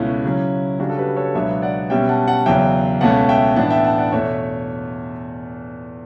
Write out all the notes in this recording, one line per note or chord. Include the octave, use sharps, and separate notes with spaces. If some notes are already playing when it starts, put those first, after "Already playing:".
Already playing: C#2 B2 A3 C#4 E4
C#3 F#3 C#4
C#3 G3 D4 F#4
A4
G4 B4
A4 C#5
C#2 B2 F#3 B3 D4 C#5 E5
D5 F#5
B2 G3 C#4 E5 G5
F#5 A5
F#5 A5
E2 C#3 F#3 E5 G5
C#2 B2 A3 C#4 F#5 A5
E5 G5
A2 E3 B3 D4 F#5 A5
E5 G5
F#5 A5
D5 F#5
E2 B2 A3 C#5 E5